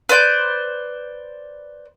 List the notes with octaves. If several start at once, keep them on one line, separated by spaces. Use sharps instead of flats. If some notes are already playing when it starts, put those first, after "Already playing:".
B4 C5 D5 G6